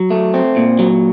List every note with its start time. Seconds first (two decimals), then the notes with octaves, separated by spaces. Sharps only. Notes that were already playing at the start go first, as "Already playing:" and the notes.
Already playing: F#3
0.11 A3
0.34 C4
0.56 A#2
0.79 F#3